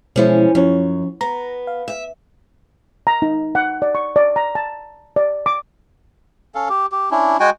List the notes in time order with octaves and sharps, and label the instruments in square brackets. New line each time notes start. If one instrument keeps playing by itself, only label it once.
[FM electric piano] B2 G#3 E4 [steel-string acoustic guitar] E3 F3 C#4
[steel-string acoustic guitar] F#2 [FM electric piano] F3 C#4 C#5
[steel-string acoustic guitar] B3 [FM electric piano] A#5
[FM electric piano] F5
[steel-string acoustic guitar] E5
[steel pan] A#5
D#4
F#5
D5
C#6
D5
A#5
A5
D5
D6
[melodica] C#4 A4 F5
G4
G4
C#4 D4 E4
G#3 F#4 G5 G#5